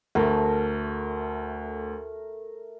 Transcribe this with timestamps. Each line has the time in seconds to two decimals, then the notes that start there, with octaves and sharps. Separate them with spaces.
0.15 D2 A3 A#4